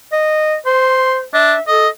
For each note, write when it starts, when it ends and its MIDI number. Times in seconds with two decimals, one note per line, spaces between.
0.12 0.56 75
0.66 1.23 72
0.66 1.16 84
1.34 1.55 62
1.34 1.61 76
1.68 1.88 69
1.68 1.89 75